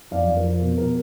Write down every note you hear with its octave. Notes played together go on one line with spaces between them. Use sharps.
F2 D5 F5
F2
A#4
F3
B2
B2 A#4